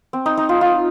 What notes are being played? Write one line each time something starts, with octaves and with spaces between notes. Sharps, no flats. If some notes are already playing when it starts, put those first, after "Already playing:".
C4
D#4
D#4
F4
F4